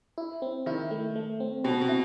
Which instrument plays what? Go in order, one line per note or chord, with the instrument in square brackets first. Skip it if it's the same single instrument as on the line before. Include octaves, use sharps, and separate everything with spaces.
[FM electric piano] E4
C4
[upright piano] D#3 [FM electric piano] E4
[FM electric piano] A3
A3
C4
[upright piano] B2 [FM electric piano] C4
[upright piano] B2
[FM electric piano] E4